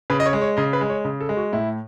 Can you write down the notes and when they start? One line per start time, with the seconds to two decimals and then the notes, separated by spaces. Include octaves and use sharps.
0.10 C#3 B4
0.20 D#5
0.26 C#5
0.33 G#3
0.41 C#5
0.57 C#3 D#5
0.73 B4
0.81 G#3
0.90 C#5
1.05 C#3
1.21 A4
1.29 G#3
1.37 F#4
1.53 A2 E4